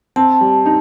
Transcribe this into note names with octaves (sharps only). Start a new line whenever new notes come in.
C4 A5
G3
D#4